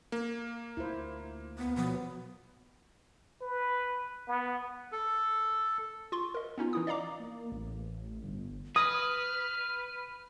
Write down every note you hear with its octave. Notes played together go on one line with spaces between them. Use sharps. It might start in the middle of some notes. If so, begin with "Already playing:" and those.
A#3
D2 E4 F4 C5
B3
B2 F3 F#3 B3
B4
B3
A4
F4 C6 C#6
A#4 D#5
B3 C#4 D#4 F4
E3 E4 D#6
D5 D#5 F5 A#5 D6
A#3
A1
G1
B4 D#6 F6